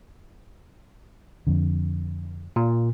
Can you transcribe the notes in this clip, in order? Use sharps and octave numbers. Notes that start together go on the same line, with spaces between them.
F2 D3
A#2